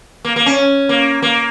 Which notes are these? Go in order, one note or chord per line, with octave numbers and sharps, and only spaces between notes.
A#3
A#3
C#4
A#3
A#3